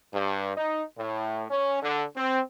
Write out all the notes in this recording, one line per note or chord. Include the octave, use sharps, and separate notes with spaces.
G2
D#4
A2
C#4
D3
C4